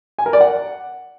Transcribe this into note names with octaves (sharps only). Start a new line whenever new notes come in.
G#5
A#4
D5
F#5